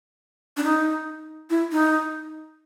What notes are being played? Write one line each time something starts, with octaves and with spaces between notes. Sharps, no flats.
D4
D#4
E4
D#4